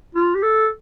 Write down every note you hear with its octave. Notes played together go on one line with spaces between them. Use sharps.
F4
G4
A4